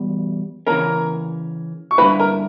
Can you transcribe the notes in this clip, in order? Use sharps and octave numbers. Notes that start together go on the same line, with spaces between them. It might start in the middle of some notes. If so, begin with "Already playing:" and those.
Already playing: E2 B2 G3
C#3 E3 A#3 C#4 A#4 A#5
C#6
G2 D3 A#3 E4 B4 B5
A#4 A#5